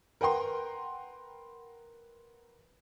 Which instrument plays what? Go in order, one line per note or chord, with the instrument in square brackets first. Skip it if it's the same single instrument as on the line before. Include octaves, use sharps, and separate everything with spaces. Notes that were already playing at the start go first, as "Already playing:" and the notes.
[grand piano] A#4 B4 F#5 G5 A#5 C6